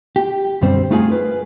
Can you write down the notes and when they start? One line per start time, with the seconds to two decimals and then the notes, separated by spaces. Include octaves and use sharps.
0.16 G4
0.61 B1 F#2 D3 G3 C4 C5
0.91 A3 D#4 F4 G#4 G5 G#5
1.10 A#4 B4